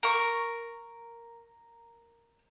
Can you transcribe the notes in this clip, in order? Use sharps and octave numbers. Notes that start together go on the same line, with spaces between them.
A#4 C#6